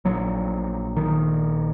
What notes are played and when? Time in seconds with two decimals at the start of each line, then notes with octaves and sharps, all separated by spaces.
0.05 A#1 A#2 F#3
0.96 D#3